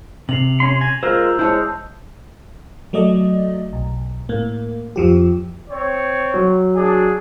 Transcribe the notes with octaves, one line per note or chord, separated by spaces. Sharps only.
C3 C7 F7 F#7
C#4 C6
G#5 A#6
G#3 F4 A#4 C5 E6 G6
G#3 E4 C5 C#5 A5 G6
F#3 A3 D5 D#5
B1
A2 A#3
F2 F3 G4
C4 C#5
F#3
D4 F#4 G#4